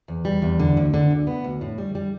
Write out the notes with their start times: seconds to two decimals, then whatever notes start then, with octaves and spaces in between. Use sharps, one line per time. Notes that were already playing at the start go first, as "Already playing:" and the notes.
0.08 E2
0.25 G3
0.42 E2
0.60 D3
0.77 D2
0.94 D3
1.11 D2
1.27 B3
1.44 D2
1.61 A2
1.78 G3
1.95 G3